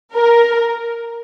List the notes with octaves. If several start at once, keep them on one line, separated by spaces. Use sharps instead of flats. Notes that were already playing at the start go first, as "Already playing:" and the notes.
A#4